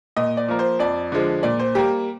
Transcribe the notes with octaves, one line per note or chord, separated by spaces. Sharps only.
A#2 D#5
D5
F3 A#3
C5
F2 D5
D3 F3 G#3
A#2 D5
C5
G3 A#3 G4